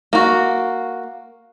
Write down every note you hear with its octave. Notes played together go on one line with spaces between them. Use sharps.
A#3 F#4